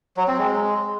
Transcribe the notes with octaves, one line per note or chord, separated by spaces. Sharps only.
F#3
C4
G#3